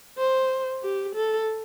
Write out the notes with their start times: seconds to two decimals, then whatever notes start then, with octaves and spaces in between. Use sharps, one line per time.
0.18 C5
0.83 G4
1.15 A4